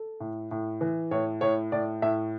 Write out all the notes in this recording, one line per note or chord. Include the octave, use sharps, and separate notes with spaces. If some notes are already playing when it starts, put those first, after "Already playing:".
Already playing: A4
A2
A2
E3
A2 C#5
A2 C#5
A2 D5
A2 E5